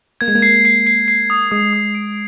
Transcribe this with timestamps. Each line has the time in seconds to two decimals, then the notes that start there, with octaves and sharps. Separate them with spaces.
0.21 A#3 G#6
0.28 G#3
0.35 A#3
0.42 C7
0.65 C7
0.87 C7
1.08 C7
1.30 D#6
1.51 G#3 D#6
1.73 D#6
1.95 D7